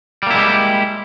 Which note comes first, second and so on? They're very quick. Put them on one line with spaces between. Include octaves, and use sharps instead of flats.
G3 A#3 E4 G#3 G4